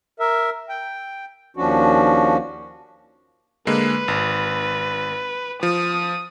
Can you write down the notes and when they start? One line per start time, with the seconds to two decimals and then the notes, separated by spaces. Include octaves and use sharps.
0.20 A#4 E5
0.69 G5
1.57 D#2 F3 C#4 D4 F#4
3.67 D3 G#3 A#3 B4
4.08 G#1
5.63 F3 D#6